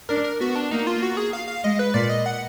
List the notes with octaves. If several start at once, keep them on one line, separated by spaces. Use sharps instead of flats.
D4 A#4
A#4
B3 F#4
D4
A#3 D#4
F4
F#4
G#4
F5
F5
G#3 D#5
B4
A#2 D5
D#5
F#5